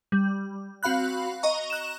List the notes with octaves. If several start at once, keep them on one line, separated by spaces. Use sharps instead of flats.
G3
C4 F#4 F5 B5 F#6
D#5 A#5 C#6
F#6 E7